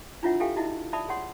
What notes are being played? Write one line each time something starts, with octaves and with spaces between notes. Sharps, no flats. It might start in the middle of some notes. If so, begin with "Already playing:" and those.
D4 E4 F4 C#5 E5 F#5
G4 A4 E5 F5 G5 G#5
D#4 E4 F#4 D#5 E5
D5 E5 A5 B5 D#6
G#4 C#5 F#5 C6